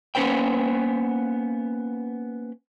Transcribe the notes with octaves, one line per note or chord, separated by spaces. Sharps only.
A#3 B3 C#4 B4 C5 G5